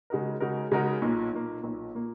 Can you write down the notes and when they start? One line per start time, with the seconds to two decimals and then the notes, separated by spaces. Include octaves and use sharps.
0.10 C#3 G#3 D#4 F#4 A#4
0.40 C#3 G#3 D#4 F#4 A#4
0.72 C#3 G#3 D#4 F#4 A#4
1.02 B1 A#2 A#3
1.32 B1 A#2 A#3
1.63 B1 A#2 A#3
1.95 A#2 A#3